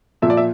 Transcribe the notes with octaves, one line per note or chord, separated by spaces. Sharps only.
A#2 F3 E5
D5
E5